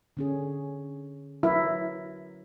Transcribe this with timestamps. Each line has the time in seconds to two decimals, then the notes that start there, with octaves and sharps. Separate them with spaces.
0.17 D3 C#4 G#4
1.43 F#3 E4 A#4